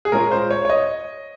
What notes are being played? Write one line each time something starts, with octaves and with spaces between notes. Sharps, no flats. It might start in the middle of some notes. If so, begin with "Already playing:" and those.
G#4
A#2 G#3 C#4 F4 A#4
C5
C#5
C#5
D#5